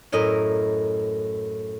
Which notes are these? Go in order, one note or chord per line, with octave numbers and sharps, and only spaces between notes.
F#2 A2 A#4 D#5 E5